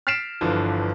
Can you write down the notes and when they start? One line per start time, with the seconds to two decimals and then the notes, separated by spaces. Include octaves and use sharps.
0.07 F6 A6 B6 C7 D7 E7
0.41 G1 D3 E3 F3